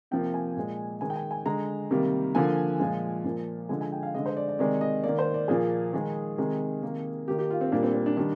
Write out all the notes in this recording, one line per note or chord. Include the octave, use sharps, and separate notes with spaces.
C3 F3 A#3 G5
G#5
A#2 G#3
D#3 G#3 G#5
G5
G#5
G#5
D3 G#3 A#5
C3 D#3 G3 A#3
D3 F3 A#3 G#5
A#2 F3 G#3
A#2 F3 A#3
D3 F3 G#3 G#5
G#5
G5
F5
D3 G#3 D#5
C5
D5
D5
C3 D#3 G#3 D5
D#5
D#3 A#3 D5
C5
D5
A#2 F3 A#3 G#4
D#3 G#3
C3 D#3 G#3
C3 D#3 A#3
D#3 A#3 G4
G4
F4
C4
A#2 G3 A#3 D4
C4
C4
D4
D#3 G3 D4